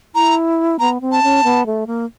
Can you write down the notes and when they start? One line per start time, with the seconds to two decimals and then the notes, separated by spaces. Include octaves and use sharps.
0.15 E4 A#5
0.79 B3 A#5
1.01 C4
1.12 A5
1.23 C#4
1.44 B3
1.66 A3
1.87 A#3